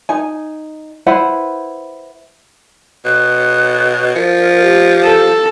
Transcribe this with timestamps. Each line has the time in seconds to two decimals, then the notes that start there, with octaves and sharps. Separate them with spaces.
0.09 D#4 G#5
1.06 E4 B4 C5 F#5
3.05 B2 F#6
4.15 F3 A#4
4.62 G4
5.03 A4